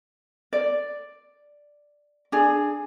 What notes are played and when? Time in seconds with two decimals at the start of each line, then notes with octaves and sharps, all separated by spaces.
0.53 D5
2.32 D4 G#4